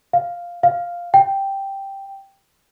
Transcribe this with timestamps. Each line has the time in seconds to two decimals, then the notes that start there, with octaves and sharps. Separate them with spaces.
0.13 F5
0.63 F5
1.14 G5